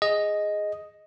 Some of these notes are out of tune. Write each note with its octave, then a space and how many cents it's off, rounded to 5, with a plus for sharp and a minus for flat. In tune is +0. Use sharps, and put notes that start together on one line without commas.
G#4 +0 D#5 +0